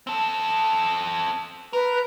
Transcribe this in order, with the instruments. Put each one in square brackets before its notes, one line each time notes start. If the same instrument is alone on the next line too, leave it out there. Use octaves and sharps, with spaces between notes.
[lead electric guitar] C4 A4
[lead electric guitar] A#4 [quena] B4